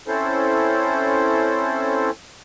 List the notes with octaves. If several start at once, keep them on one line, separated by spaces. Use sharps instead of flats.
C4 C#4 E4 A4 C5